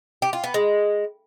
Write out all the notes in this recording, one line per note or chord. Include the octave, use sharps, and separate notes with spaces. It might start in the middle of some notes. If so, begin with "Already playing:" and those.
G4
F4
B3
G#3